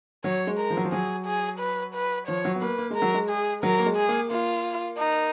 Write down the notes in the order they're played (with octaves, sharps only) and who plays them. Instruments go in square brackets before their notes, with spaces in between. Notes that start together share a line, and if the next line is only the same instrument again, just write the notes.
[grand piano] F#3 [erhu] C#5
[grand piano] G#3
[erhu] A#4
[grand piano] F3
F#3
F3
[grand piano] F#3 [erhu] G#4
[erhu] G#4
B4
B4
[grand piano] F3 [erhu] C#5
[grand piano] F#3
B3
[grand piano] A#3 [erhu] B4
[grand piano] A#3
[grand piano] G#3 [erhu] A#4
[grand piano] F#3
G#3
[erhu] G#4
[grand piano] F#3 [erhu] A#4
[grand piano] A#3
G#3
[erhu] G#4
[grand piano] A#3
[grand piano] A#3 [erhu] F4
[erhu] D#4